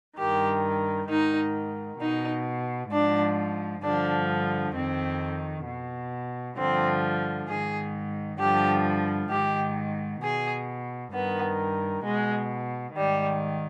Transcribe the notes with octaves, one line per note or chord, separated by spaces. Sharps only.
G2 D#3 G4
G#2 D#3 D#4
B2 D#4
G#2 F3 D4
G2 D3 F3 D4
F2 D#3 C4
B2
G2 D3 F3 C4
G#2 D#3 G#4
G2 D3 F3 G4
G#2 D#3 G4
B2 G#4
G2 D#3 B3
B2 G#3
G#2 D#3 G3